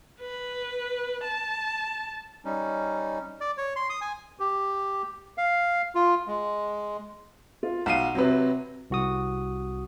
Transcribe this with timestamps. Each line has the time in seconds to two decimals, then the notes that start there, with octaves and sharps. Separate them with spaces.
0.21 B4
1.23 A5
2.45 G3 C#4 D#4
3.41 D5
3.58 C#5
3.76 C6
3.90 D#6
4.01 G#5
4.40 G4
5.38 F5
5.95 F4
6.27 G#3
7.63 F4
7.86 B1 F5 F#5 D#7
8.15 C3 F#3 C4 B4
8.90 C2 F#4 D#6